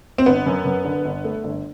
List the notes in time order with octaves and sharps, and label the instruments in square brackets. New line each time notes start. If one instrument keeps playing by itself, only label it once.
[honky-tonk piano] C4
[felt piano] G1 [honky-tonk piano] B3
[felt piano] F#2
F#2
D3
G1
A3
G1